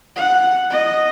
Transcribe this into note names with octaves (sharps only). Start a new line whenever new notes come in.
F#5
D#5